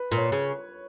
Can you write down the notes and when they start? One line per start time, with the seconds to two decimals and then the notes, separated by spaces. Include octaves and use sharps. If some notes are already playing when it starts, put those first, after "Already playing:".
Already playing: B4
0.12 A#2
0.18 C#5
0.32 C#3